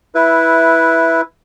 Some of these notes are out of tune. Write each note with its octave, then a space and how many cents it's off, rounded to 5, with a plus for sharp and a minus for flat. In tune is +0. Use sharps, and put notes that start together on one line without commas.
E4 +0 B4 -10 E5 +5